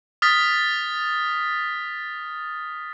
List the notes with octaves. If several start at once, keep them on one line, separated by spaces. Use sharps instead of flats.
D#6 F6 A6 B6